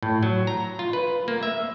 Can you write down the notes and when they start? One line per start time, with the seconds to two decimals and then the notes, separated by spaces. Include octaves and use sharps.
0.03 A2
0.23 F#3
0.47 A#5
0.79 F4
0.93 B4
1.28 A#3
1.43 E5